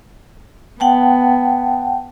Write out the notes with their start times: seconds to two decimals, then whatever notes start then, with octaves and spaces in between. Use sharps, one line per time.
0.80 B3 F#5 G5 A5